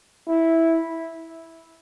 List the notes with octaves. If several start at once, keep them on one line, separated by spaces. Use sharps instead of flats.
E4